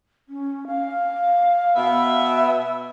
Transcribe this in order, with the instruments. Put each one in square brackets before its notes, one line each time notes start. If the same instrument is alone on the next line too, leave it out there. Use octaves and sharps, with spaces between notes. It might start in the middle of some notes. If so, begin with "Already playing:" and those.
[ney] C#4
F5
[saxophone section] B2 B3 E5